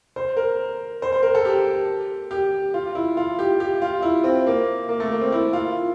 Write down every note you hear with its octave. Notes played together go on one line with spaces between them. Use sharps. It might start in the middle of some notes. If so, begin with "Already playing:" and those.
C5
A#4
C5
C5
A#4
A4
G4
G4
F4
E4
F4
G4
G4
F4
E4
C4
A#3
A#3
A3
A#3
C4
E4
F4